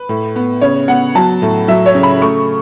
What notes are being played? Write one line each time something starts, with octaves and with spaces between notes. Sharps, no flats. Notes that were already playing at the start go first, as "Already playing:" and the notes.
Already playing: B4
A2
B3
C#3 C#5
B3 F#5
F#3 A5
A2
F#3 E5
C#5
C#3
B5
A3 C#6